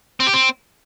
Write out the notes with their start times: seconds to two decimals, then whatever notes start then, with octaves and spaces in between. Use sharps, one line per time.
0.20 C4
0.27 G4
0.34 C4